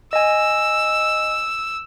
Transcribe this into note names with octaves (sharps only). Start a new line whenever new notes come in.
D#5 G#5 E6